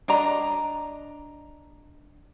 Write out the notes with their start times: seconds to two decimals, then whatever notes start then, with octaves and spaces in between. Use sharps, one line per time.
0.08 D4 D#5 A#5